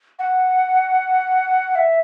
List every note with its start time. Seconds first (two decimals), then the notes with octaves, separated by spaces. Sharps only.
0.19 F#5
1.75 E5